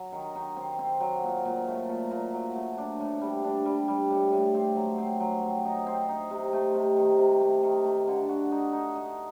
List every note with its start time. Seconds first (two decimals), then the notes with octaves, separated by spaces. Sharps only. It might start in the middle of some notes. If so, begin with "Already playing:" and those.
Already playing: F#3
0.12 D#3
0.35 D#3
0.57 C4
0.79 C4
1.01 F#3
1.24 A#2
1.45 A#2
1.67 A3
1.89 A#2
2.11 A#2
2.33 F#3
2.55 A3
2.78 D4
3.00 A2
3.21 G3
3.44 D4
3.65 G3
3.88 G3
4.10 A2
4.32 A2
4.54 C4
4.76 F#3
4.98 C4
5.20 F#3
5.43 C4
5.65 D#4
5.86 C4
6.09 D#4
6.30 C3
6.53 A3
6.75 C3
6.97 D#3
7.19 C3
7.41 A3
7.63 D#3
7.84 A3
8.08 D3
8.29 F#4
8.52 D#4
8.72 D#4
8.95 D#4